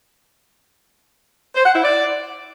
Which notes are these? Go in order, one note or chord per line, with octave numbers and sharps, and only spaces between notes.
C5
F#5
E4
D5